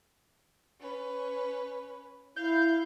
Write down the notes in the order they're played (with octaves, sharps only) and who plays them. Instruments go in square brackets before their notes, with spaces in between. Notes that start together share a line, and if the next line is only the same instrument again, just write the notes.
[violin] C#4 B4
[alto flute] E4 [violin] F5 [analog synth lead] G6